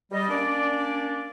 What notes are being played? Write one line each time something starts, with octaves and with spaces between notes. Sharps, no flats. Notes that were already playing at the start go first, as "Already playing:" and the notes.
G3 D#5
A#3 C#4 D4 D5